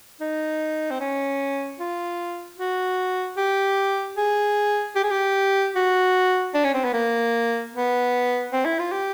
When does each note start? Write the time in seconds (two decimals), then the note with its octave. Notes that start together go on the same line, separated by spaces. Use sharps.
0.21 D#4
0.91 C4
1.00 C#4
1.79 F4
2.58 F#4
3.37 G4
4.17 G#4
4.95 G4
5.04 G#4
5.11 G4
5.75 F#4
6.54 D4
6.64 C#4
6.74 C4
6.84 B3
6.93 A#3
7.74 B3
8.52 C4
8.65 E4
8.79 F4
8.92 G4